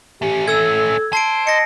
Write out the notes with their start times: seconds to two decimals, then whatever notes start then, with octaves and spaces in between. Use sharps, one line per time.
0.22 A3 C#4 G4
0.48 A4 E6 G#6
1.13 C5 A5 C7 D7
1.47 D#5 A#6 C#7